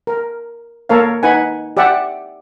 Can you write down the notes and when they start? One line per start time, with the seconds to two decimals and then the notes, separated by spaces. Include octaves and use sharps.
0.07 A#4
0.89 A#3 A4 A#4 C#5 F5
1.23 D#4 B4 F#5 G#5
1.77 G4 D5 E5 F#5